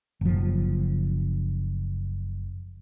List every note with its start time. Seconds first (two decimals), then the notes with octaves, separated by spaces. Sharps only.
0.21 F#1 F3